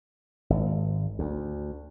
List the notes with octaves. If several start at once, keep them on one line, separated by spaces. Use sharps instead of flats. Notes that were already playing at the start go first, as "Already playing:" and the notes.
G#1
D2